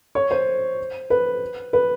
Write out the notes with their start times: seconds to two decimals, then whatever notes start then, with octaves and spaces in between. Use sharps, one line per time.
0.15 C#5
0.31 C5
1.10 B4
1.73 B4